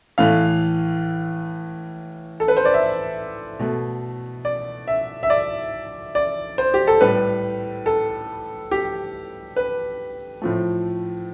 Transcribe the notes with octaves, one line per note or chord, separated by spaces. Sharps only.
A2 E3 A3 F5
A4
B4
C5
D5
E5
B2 A3
D5
E5
E5
D5
D5
C5
G4
A4
A2 G3 B4
A4
G4
B4
A2 F3 A3